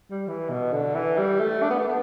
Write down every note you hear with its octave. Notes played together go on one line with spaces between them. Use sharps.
G3
E3
B2
D3
E3
G3
A3
D4
B3
A3
B3